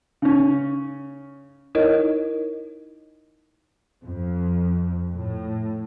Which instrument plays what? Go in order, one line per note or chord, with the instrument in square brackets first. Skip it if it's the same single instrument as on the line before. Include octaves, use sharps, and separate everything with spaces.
[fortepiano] C#3 C#4
[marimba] D#4 E4 A#4 C#5 D#5
[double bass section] F2
A2